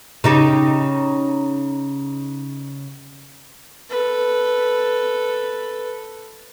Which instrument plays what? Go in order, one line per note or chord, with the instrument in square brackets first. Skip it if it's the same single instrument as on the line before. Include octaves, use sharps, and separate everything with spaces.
[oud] C#3 D#4 G4
[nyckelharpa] A4 B4